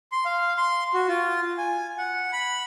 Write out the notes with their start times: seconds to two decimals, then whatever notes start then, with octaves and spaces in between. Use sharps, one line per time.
0.12 C6
0.25 F5
0.57 C6
0.94 F#4
1.09 F4
1.58 G#5
1.98 F#5
2.33 B5